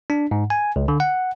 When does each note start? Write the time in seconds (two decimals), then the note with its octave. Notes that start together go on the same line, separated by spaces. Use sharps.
0.10 D4
0.31 G#2
0.50 G#5
0.76 C#2
0.88 D3
1.00 F#5